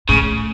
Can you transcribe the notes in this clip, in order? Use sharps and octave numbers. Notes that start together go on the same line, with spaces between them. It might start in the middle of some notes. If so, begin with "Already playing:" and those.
A2 C#3